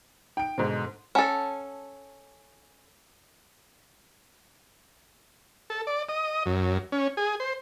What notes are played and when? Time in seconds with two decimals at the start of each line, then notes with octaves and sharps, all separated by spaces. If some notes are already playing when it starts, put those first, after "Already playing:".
0.37 D#4 G5 D7
0.58 G#2 B2 D3 C5
1.15 C#4 A4 F#5 A5
5.70 A4
5.87 D5
6.09 D#5
6.46 F#2
6.92 C#4
7.17 G#4
7.40 C5